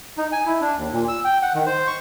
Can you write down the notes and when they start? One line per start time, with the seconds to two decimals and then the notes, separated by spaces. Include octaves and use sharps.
0.18 D#4
0.32 G#5
0.46 E4
0.61 D4
0.77 D#2
0.93 A#2
1.08 E6
1.24 G5
1.42 F#5
1.55 D#3
1.66 C5
1.87 C#6